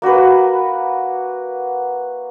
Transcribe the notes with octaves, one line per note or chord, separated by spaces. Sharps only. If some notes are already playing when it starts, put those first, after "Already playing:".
A#3 F#4 A#4 B4